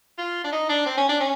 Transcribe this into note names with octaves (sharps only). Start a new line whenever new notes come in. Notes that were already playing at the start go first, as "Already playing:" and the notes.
F4
D4
D#4
D4
C4
C#4
D4
C#4